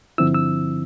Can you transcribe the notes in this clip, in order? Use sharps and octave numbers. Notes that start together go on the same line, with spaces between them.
G2 D3 F3 C4 E4 E6
E6